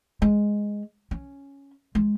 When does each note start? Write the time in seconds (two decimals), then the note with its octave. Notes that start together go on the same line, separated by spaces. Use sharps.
0.22 G#3
1.11 C#4
1.95 G#3